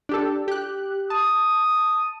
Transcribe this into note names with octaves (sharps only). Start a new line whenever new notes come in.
D4 G4 A4
G4 F#6
A5 D#6